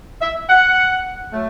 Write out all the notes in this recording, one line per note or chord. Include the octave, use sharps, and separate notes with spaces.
E5
F#5
F#3 A3